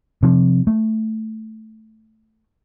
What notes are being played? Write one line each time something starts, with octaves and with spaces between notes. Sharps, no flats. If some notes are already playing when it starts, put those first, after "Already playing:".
C3 F3
A3